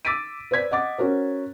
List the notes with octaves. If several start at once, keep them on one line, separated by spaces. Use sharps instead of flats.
D6 E6 A6 B6 D7 D#7
B4 C5 D5 G#6 B6
D#5 F#5 D6 A6
C#4 F#4 A#4 C5